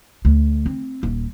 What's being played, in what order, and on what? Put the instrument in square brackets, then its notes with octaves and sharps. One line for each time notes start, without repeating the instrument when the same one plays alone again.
[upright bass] D2
C4
D#1